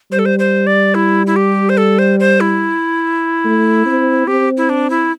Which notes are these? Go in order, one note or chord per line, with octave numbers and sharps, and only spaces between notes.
G3 C5
A4
C5
C5
D5
E4
E4
G4
C5
A4
C5
C5
E4
A3
C4
C4 G4
E4
D4
E4